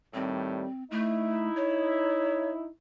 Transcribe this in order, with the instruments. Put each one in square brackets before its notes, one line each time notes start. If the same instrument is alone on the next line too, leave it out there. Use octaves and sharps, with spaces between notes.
[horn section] A2 D#3 G3 [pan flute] C4
[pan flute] A3 [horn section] D#4 E4
[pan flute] C#5